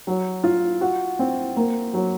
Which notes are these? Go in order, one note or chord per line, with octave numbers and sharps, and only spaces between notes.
F#3
F4
F#4
C4
A#3
F#3